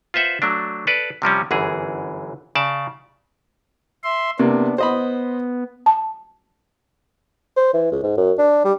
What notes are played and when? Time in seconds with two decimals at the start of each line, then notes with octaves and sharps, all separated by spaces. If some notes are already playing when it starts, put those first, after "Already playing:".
0.14 F4 B4 C5 E5 F#5
0.42 F#3 A3 D4
0.87 A4 B4 D5
1.22 C3 F3 G3 C#4
1.51 G1 F#2 E3 G#4
2.55 C#3 D5 A5
4.04 E5 C6
4.39 C3 A#3 B3 D4
4.78 B3 C5 D#5 B5
5.86 A5
7.56 C5
7.74 E3
7.91 C#2
8.03 G#2
8.17 F#2
8.38 D4
8.65 G3